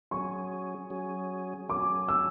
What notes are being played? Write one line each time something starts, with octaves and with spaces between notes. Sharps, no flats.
F#3 C#4 G#4 C#6
F#3 C#4 G#4
F#3 C#4 G#4 D6
E6